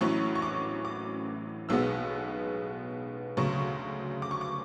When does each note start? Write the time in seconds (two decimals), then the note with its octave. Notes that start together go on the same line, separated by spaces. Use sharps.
0.01 A1 A2 F#3 C#4 E4 C#6
0.35 C#6
0.42 D6
0.85 D6
1.69 B1 B2 G#3 B3 E6
3.37 D2 C#3 F#3 C#6
4.22 D6
4.31 C#6
4.41 D6